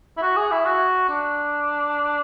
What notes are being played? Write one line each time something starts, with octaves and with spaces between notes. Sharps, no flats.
E4
F#4
G#4
E4
F#4
D4